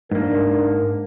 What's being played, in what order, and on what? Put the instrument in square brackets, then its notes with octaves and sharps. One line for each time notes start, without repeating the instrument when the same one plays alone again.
[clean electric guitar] G#2 A#3 [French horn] D4 [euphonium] A#4